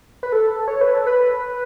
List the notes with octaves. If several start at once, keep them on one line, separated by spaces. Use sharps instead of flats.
B4
A4
C#5
B4
A4
B4